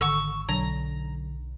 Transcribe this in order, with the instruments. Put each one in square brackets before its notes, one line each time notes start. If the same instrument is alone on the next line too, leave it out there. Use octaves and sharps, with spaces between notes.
[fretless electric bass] G#1 [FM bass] D3 [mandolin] C#6 E6
[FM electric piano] B1 [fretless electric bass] D3 [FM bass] F#3 [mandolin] A#5